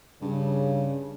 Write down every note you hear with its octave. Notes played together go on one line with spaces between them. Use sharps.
G2 C#3